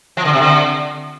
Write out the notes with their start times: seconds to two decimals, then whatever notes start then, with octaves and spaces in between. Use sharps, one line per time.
0.17 F3
0.25 D3
0.33 C3
0.41 D3